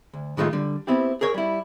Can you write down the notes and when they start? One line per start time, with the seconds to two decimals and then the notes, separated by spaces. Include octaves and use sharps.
0.14 D2
0.37 A2 D#3 G#3 A3 F4
0.53 D3 G3
0.87 B3 C4 E4 G4
1.21 G#4 A#4 C#5
1.34 G3 E4